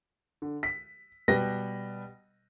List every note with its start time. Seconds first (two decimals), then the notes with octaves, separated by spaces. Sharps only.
0.42 D3
0.63 B6
1.28 B2 G3 B4 G5 A#6